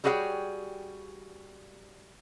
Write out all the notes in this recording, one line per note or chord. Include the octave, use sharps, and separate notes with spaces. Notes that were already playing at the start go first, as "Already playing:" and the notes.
G3 F#4 G#4 C#5 E5 G5